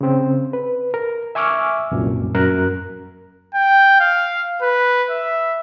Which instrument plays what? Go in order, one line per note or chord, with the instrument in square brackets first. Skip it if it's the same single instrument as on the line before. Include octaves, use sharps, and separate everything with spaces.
[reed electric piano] C#3 C4
B4
A#4
E5 G#5 C#6 D6 E6 F6
C2 F#2 A#2
F#2 A#4 F#6
[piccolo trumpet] G5
F5
B4
E5